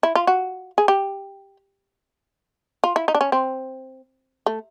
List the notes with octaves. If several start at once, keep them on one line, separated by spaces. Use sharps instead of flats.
E4
F4
F#4
G#4
G4
F4
E4
D#4
D4
C#4
C4
A3